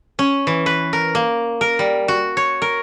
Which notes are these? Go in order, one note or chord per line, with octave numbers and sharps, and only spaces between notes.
C#4
E3
B4
A#4
A#3
A#4
G3
F#4
C#5
A#4